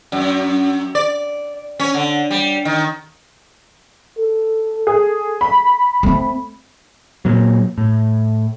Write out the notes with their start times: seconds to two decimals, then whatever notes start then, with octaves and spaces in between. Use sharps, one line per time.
0.12 F#2
0.95 D5
1.80 C#4
1.94 D3
2.31 G3
2.65 D#3
4.18 A4
4.87 G#4
5.41 B5
6.03 A3 C4
7.25 A#2 F#3
7.78 A2